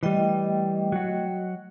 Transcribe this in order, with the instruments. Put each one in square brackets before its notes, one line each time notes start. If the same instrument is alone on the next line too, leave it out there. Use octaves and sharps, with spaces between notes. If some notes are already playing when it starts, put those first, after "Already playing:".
[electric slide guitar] E3 G3 [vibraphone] A3 D#5 G5
[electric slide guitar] F#3 F#4